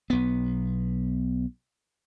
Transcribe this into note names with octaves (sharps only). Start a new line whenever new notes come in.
B1 B3